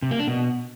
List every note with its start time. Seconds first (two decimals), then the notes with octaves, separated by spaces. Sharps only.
0.02 C3
0.11 A#3
0.19 D4
0.28 B2